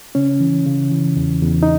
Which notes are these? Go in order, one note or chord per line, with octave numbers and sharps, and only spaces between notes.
C#3 C#4
E3
C#3
E3
E2
E2
D#4